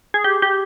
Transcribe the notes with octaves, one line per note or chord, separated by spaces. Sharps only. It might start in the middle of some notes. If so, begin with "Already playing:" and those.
G#4
G4
G4